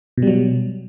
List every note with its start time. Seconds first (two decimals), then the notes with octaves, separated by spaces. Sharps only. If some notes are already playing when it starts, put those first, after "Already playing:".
0.17 B2
0.22 G3
0.27 F#3